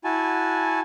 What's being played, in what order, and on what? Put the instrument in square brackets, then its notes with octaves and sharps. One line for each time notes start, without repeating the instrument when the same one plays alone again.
[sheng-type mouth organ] E4 F#4 G#5 A5